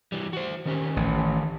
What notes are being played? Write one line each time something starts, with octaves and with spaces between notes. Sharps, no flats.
E3 G3
F#4 C5
D#3 C#4 G4
A1